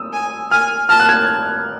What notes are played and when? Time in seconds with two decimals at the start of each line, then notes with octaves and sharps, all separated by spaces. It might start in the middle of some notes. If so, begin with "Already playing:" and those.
Already playing: D#6 E6
0.13 G#5
0.51 G#5 F6
0.89 A5 F6
1.00 F#6
1.09 G#6